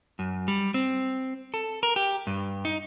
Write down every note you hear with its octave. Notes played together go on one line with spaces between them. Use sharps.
F#2
G3
C4
A4
A#4
G4
G2
D#4